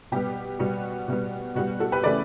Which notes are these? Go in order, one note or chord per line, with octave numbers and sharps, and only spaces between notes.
B2 G3 B3 G4
B2 G3 B3 F#4
B2 G3 B3
B2 G3 B3 F#4
F#4 A4
G4 B4
C#3 E3 A3 B4 D5